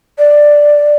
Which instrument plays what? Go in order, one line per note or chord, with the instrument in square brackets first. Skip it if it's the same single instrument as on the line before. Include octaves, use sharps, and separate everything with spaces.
[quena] D5